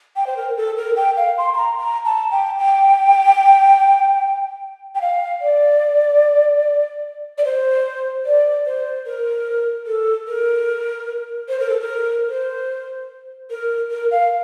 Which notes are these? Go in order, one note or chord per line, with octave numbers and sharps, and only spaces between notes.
G5
C5
A#4
A4
A#4
G5
F5
C6
C6
A#5
A#5
A5
G5
G5
G5
F5
D5
D5
C5
D5
C5
A#4
A4
A#4
C5
A#4
A4
A#4
C5
A#4
A#4
F5